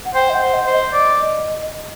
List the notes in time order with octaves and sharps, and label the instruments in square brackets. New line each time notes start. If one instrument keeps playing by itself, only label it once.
[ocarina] F#5
[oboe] C5 [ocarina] G5
[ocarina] D#5
F#5
[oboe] C5
[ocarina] D#5
[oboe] C5
[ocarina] D#5
[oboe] D5